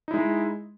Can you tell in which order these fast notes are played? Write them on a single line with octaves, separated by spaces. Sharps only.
D#4 E4 G#3